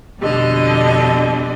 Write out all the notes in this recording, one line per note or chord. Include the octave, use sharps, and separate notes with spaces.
F2 B2 D3 G3 D#5